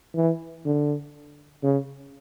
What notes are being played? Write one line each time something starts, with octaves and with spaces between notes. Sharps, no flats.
E3
D3
C#3